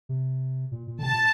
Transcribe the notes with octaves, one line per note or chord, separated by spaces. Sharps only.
C3
A#2
A#2
D3
C3 A5
A#2